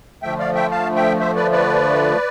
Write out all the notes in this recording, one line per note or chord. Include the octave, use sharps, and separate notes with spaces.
D3 F3 A3 E5 G5
D5 F5
E5 G5
F5 A5
E5 G5
C5 E5
B4 D5
B4 D5